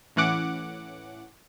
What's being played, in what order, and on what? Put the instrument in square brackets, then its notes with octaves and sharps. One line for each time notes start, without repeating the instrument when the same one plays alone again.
[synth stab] A2 E3 C#4 F#5 D6